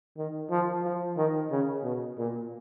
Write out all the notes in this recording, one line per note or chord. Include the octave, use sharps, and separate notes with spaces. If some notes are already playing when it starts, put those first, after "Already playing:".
D#3
F3
F3
D#3
C#3
B2
A#2